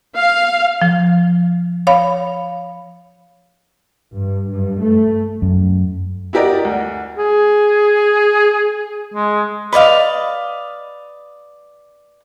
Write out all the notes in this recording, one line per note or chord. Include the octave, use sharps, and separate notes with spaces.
F5
F3
C#5 F5 B5
G2
G2
A3
F#2
E4 F#4 G4 A#4 D5 D#5
D2
G#4
G#3
B4 D5 D#5 F5